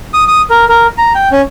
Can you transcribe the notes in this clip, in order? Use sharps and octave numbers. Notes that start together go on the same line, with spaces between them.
D#6
D#6
A#4
A#4
A#5
G5
C#4